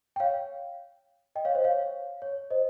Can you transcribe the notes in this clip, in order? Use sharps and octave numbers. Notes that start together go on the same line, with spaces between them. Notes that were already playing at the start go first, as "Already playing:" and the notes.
G5
C#5 F5
D#5 G5
C#5 F5
C5 D#5
C#5 F5
C#5
C5 D#5